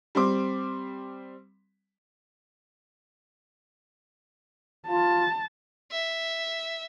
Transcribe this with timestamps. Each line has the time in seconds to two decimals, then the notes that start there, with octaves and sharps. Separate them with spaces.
0.15 G3 C4 C6 D6
4.88 F4 A5
5.91 E5